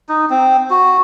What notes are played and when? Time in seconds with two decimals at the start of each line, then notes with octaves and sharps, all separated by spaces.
0.09 D#4
0.30 C4
0.70 F#4